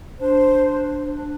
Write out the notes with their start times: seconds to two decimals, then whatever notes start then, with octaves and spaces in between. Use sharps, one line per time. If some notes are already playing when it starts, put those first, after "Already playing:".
0.20 D4 C5